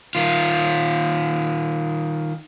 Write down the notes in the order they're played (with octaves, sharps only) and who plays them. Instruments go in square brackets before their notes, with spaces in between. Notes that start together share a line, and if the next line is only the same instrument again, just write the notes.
[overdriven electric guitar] D#3 F4